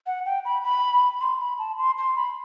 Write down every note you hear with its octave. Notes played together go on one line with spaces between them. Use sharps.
F#5
G5
B5
B5
C6
B5
A5
C6
C6
B5